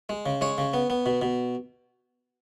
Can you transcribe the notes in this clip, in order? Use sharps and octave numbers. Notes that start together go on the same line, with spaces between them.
G#3
C#3
G#3 C#5
C#3
B3
B3
B2
B2